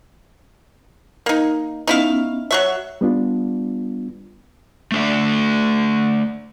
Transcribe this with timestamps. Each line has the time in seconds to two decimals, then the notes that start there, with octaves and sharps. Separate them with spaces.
1.26 A#3 D#4
1.87 B3 C#4 D#4 E4 F5
2.51 F#3 F#4 C#5 E5 F#5
3.01 G3 B3 D4 F4
4.92 A3 D4 E5